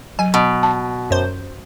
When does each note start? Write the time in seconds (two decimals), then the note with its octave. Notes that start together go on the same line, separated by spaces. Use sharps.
0.19 F#3 G#5
0.34 B2
0.63 A5
1.11 F#2 C5